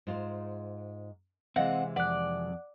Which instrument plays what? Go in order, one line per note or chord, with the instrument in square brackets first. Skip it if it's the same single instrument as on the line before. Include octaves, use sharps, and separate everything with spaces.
[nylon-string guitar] G#2 F4 C5
[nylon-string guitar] C3 E3 G#3 [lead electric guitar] C4 [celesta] D#5 F5 [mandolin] F#5
[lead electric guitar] F2 [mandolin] D5 [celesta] F#5 F#6